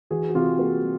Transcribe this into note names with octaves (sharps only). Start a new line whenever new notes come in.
E3 F#4 G#4
F#4
C3 F4 G4
A#3 F#4 G#4
G3